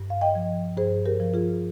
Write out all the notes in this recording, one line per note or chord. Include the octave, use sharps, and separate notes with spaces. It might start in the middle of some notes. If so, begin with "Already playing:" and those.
Already playing: G2
F5
D#5 G5
F3
G2 G#4 C5
G4 A#4
F3
F4 G#4